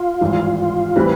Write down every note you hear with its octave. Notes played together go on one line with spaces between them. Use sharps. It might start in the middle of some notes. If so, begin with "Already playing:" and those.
Already playing: F4
G#1 G2 E3
A2 E3 G3 C4 B4